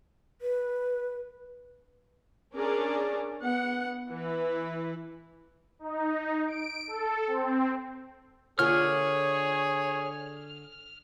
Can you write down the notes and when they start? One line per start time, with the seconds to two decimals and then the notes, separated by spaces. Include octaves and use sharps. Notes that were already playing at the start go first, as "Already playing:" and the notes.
0.42 B4
2.54 C#4 D4 G#4 A#4 D5
3.41 B3 F#5
4.09 E3 E4 B4
5.79 D#4
6.48 D7
6.87 A4
7.27 C4
8.59 D3 A#3 F4 G#4 C#5 F6